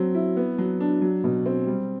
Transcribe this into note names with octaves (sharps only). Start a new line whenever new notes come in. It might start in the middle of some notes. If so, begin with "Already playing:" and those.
Already playing: F#3 C4
E4
B3
F#3
D4
F#3
B2
C4
G3